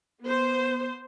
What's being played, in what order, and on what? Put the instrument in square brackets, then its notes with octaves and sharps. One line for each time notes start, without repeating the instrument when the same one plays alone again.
[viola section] B3 C5